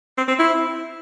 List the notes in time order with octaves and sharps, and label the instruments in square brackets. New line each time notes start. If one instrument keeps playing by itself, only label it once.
[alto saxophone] C4
C4
E4